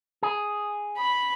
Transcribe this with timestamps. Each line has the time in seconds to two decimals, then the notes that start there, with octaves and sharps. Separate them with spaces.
0.23 G#4
0.98 B5